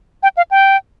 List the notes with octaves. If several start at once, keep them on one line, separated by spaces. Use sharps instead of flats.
G5
F5
G5